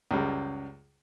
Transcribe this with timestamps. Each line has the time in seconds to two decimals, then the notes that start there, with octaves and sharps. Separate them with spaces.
0.11 C#2 F#2 G3 G#3